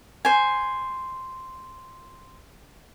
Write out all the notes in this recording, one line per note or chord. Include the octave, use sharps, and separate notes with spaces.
C5 G#5